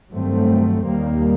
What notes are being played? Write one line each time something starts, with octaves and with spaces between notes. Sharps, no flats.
G2 D#3 F#3 A3 C4
D#2 D#3 G3 A#3